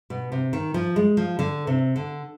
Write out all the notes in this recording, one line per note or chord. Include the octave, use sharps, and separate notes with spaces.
B2
C3
D#3
F3
G#3
F3
D3
C3
D3